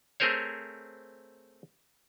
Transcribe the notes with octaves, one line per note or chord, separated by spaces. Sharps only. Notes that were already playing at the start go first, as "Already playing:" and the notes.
A3 C4 G#4 A#4 C5 C#5